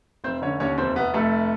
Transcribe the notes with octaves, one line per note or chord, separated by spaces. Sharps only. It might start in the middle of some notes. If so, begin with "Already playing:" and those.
F1 C4 C5
D3 C#4 C#5
D#2 C#4 C#5
F1 C4 C5
F1 B3 B4
F1 A3 A4